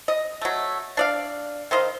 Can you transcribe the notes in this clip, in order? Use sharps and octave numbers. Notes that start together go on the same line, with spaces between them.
D#5
F#3 A3
D4 D5 F5
D#3 C5 D#5 F5